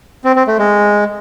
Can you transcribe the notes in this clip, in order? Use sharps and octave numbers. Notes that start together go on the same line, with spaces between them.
C4
C4
A3
G#3